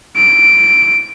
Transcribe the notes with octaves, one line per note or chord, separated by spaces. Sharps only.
D7